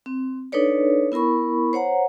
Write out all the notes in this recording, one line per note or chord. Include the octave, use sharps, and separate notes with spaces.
C4
D4 D#4 A4 B4 C#5 D5
B3 E4 A#4 B5 C#6
C5 C#5 F#5 A#5